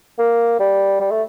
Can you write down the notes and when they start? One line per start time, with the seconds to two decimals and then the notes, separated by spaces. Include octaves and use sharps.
0.19 A#3
0.60 G3
1.00 G3
1.11 A3